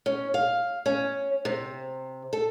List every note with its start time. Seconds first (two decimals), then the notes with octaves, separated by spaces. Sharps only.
0.06 C#4
0.34 F5
0.86 C#4
1.45 C3
2.33 A4